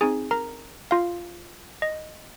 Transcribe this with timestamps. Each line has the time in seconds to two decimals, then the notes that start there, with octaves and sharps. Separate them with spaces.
0.01 C4 D#4 G#4 G#5
0.31 A#4 A#5
0.91 F4 F5
1.82 D#5